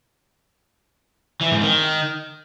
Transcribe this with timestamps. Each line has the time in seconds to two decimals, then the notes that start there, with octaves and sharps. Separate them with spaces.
1.41 E3
1.51 G#2
1.61 D#3